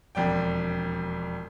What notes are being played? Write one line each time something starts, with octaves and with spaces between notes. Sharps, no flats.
E1 F2 D5 G5